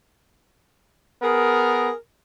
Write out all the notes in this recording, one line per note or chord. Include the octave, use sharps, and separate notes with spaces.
B3 G#4 A#4